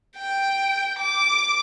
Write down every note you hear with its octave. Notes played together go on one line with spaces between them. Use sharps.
G5
D6